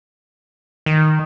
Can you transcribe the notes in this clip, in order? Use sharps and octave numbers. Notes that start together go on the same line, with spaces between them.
D#3